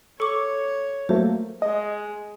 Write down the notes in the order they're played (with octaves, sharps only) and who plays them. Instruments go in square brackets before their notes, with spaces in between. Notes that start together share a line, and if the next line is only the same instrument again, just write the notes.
[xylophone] A4 D6 [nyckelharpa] C#5 [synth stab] C#6
[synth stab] F#3 A3 A#3 [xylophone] C5
[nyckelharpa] G#3 [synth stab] D#5